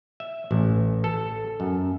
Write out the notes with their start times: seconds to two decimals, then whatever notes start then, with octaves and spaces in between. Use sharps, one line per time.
0.20 E5
0.51 A1
1.04 A4
1.60 F#2